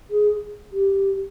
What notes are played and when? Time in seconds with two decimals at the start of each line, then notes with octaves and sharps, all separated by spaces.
0.10 G#4
0.72 G4